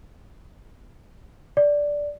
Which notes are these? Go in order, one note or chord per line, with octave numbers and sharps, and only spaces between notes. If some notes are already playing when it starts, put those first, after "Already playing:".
D5